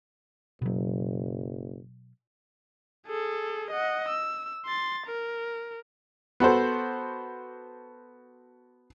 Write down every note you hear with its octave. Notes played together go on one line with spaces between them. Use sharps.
F#1 B2 F#3
G#4 A4
D#5 F#5
E6
C6 A6
A#4
B3 F#4 A4 C5